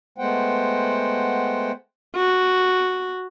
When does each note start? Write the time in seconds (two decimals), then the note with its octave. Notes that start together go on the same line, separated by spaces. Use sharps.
0.18 G#3 A3 B3 C5 F#5 G5
2.16 F#4